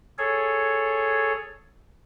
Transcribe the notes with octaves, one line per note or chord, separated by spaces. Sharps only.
G#4 A4 C#5